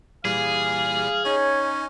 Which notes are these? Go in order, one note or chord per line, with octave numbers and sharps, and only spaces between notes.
A#2 E3 G3 G#4 F5
C#4 D#4 C#5 G#5